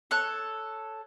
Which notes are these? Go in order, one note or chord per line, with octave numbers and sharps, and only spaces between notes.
A4 C#5 F#6